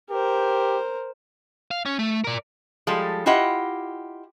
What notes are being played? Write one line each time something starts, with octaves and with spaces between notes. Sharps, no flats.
G4 A#4 C5
F5
C#4
A3
A#4 D5
F3 G3 G#3 A4
E4 F4 G4 D#5 F#5